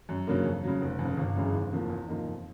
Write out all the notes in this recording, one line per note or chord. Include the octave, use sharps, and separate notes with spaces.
F#2
C#3 F#3 A#3 D4
F2
C#3 F#3
F1
F2
C#3
G1
F#2 C#3 E3 G#3
F1
E2 C3 F3 A#3
E2
C3 F3 A#3 D#4
F2